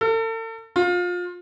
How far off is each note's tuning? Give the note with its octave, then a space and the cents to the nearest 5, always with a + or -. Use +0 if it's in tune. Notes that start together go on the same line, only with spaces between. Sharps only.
A4 +40
F4 +25